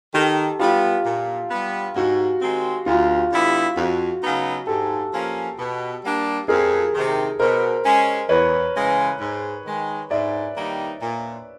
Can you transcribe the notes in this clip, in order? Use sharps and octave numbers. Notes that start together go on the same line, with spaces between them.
D#3 G4 A4
G3 B3 F4 G4
A#2
G3 B3
G#2 F#4
D#3 G#3 C4
D2 F4
D3 G3 B3 E4
F2 F#4
C#3 F#3 B3 D#4
G#2 G4 A4
F3 A#3 C#4
B2
G3 A#3 D4
F2 G#4 A#4
C3 D#3
B2 A#4 C5
G#3 C#4
E2 B4 C#5
C#3 E3 G#3
G#2
D#3 G#3
G#2 D5 E5
D#3 G3 A#3 D#4
A#2